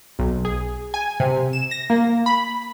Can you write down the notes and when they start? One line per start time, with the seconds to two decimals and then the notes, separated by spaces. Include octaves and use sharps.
0.19 B1
0.45 G#4
0.94 G#5
1.20 C3
1.53 E7
1.71 A#6
1.90 A#3
2.26 B5